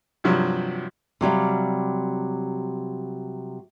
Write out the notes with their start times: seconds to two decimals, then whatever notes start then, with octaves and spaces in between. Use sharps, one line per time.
0.24 G2 C3 F3 F#3
1.21 C3 F#3 G3 F5